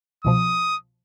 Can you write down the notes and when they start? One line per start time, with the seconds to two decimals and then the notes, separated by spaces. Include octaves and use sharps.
0.25 C2 B2 F3 D#6